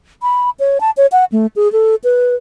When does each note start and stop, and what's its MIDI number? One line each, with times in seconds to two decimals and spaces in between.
0.22 0.50 83
0.60 0.81 73
0.81 0.91 81
0.97 1.07 73
1.12 1.25 78
1.32 1.47 57
1.56 1.71 68
1.72 1.95 69
2.04 2.35 71